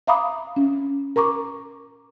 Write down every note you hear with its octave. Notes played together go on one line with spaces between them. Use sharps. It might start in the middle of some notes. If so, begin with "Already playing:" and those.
E5 F5 A#5 B5 D6 D#6
C#4
A#4 A#5 C#6 D6